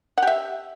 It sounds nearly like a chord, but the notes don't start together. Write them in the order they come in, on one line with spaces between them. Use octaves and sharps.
F#5 G4 E5